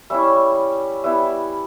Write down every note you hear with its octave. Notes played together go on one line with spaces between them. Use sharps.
G3 C#4 E4 E5
G3 B3 E4 E5